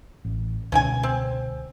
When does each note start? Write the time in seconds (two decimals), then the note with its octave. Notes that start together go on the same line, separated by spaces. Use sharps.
0.25 A1
0.72 C#2 B2 D3 C#4 G5 G#5
1.03 C4